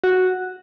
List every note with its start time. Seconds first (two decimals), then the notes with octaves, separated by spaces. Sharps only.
0.04 F#4